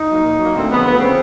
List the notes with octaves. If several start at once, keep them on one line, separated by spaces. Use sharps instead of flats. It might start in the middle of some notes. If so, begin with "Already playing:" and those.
Already playing: D#4
F#3 A#3
A#2
F#3 A#3
D2 C4
C#3 F3 B3
D2 B3
C#3 F3 C4